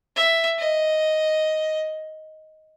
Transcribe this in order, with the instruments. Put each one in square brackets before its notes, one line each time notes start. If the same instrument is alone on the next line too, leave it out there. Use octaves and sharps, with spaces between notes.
[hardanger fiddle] E5
D#5